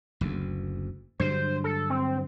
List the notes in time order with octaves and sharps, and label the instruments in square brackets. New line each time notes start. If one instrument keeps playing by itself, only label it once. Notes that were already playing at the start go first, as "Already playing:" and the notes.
[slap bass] F#1 D2
[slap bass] G2 D3 F#3 [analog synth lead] C5
[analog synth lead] A4
C4